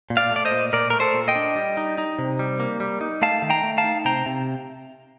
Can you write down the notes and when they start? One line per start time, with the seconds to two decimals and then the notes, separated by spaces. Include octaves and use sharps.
0.10 A#2
0.17 D5 F5
0.31 A3 D5
0.45 C5 D#5
0.51 A#2
0.73 A#2 A#4 D5
0.90 A3 A#4
1.00 A4 C5
1.14 A#2
1.28 D#5 G5
1.35 D4
1.56 G3
1.77 D#4
1.98 D#4
2.19 C3
2.39 G3
2.60 A#3
2.80 G3
3.01 D#4
3.22 A3 F5 A5
3.42 D#3
3.50 G5 A#5
3.63 A3
3.78 F5 A5
3.84 D#4
4.05 C3 G5 A#5
4.26 C3